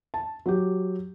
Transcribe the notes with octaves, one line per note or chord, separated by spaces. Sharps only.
A5
F#3 G4